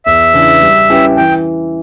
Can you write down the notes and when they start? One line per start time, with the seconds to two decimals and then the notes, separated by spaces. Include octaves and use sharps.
0.06 E2 E5
0.33 C#3 E3 B3 D4
0.62 G3
0.90 C#4 E4 G4 B4
1.17 E3 G5